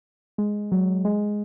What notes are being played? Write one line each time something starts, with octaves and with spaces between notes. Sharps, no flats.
G#3
F#3
G#3